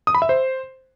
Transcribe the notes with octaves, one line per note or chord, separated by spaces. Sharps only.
D#6
B5
E5
C5